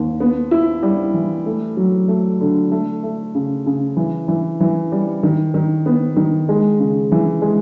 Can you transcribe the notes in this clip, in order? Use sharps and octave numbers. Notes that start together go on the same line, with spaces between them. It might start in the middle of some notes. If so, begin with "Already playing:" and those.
Already playing: D#2
B3
E4
G3
E3
A3
F#3
A3
D3
A3
A3
C#3
C#3
E3
E3
E3
G3
D#3
D#3
B3
D#3
G#3
C#3
E3
G#3